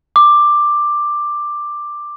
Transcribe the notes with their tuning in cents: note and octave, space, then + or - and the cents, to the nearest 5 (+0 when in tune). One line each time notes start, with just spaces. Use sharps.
D6 +10